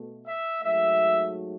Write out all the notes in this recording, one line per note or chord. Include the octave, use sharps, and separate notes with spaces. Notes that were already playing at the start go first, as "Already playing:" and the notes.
Already playing: B2 A3
E5
G#2 F#3 A3 E5